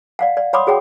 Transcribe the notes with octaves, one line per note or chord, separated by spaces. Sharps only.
D5 F5 F#5
D5
C#5 F#5 B5 C6 D6 D#6
F#4 G#4 C#5 F#5 G5